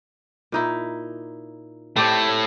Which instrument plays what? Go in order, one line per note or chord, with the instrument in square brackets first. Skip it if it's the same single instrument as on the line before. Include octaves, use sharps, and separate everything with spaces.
[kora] A#2 D#4 E4
[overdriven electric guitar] A2 A3 [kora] C4 G4 D5